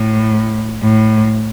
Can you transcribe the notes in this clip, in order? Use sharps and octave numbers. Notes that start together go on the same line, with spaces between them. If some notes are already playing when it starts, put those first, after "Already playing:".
Already playing: A2
A2